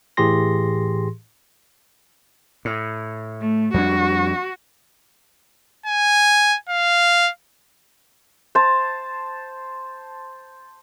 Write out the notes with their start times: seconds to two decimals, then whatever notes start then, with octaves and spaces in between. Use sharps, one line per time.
0.17 A2 E3 G4 G#4 C6 A#6
2.65 A2
3.41 A3
3.74 F2 G3 D4 F#4
5.86 G#5
6.69 F5
8.55 C5 A5